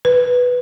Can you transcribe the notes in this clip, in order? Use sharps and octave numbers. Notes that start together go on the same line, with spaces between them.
B4